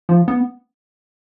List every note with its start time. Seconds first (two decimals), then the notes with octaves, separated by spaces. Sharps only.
0.09 F3
0.28 B3